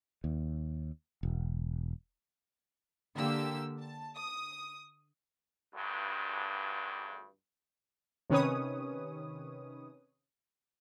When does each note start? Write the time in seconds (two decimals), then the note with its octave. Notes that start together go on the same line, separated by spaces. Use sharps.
0.24 D#2
1.23 E1
3.18 D3 A#3 G4 E6
3.79 A5
4.15 D#6
5.74 G#1 D2 G2
8.30 C3 D#3 C#4 B4 C#5 D#6